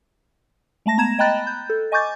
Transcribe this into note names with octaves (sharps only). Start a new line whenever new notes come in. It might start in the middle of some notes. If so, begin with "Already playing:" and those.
G#3 A3 A5 A#6
B3 A#5 G#6 E7
D#5 G5 A#5 B5 F#6 A6
G6
A4
D#5 G#5 C#6 D6 G6 A6